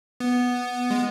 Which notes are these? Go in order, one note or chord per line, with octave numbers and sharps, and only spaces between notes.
B3
G#3